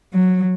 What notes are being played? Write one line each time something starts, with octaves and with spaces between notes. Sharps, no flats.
F#3